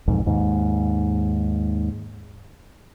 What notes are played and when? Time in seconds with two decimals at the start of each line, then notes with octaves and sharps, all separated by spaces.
0.08 B1 F2 G#2
0.26 D#2 G#2